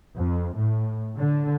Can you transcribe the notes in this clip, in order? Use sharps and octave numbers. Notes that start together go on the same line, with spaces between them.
F2
A2
D3